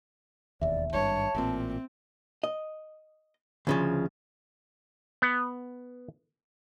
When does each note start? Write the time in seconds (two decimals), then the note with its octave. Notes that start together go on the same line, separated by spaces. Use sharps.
0.61 E1 D#2 D5 E5
0.93 G#1 G2 C#5 A5
1.35 A1 A#2 C4
2.44 D#5
3.67 D2 C#3 F3
5.22 B3